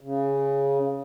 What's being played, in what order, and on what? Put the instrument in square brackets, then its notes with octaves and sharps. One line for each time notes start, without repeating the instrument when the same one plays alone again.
[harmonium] C#3